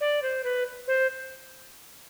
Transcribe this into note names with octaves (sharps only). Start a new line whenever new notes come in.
D5
C5
B4
C5